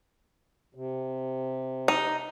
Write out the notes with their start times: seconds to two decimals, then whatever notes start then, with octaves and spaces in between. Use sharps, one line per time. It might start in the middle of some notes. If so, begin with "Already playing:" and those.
0.75 C3
1.88 D#4